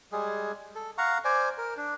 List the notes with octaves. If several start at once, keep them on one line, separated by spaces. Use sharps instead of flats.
G3 G#3 G#4
A4
F5 F#5 A#5 C#6
C5 D5 G#5
A#4
D4